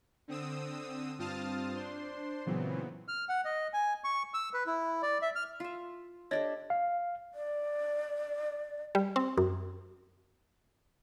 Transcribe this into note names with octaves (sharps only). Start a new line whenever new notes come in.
D3 C4 D#6 E6
G2 C4 F4 A5 D#6 F6
D4 C5 C6
A#2 C#3 E3 F#3 B3 C4
F6
F#5
D#5
G#5
C#6
E6
B4
E4
D5
E5
F6
F4 E5
D4 G4 A4 C#5 D#5 A6
F5
D5
G3
C4
F#2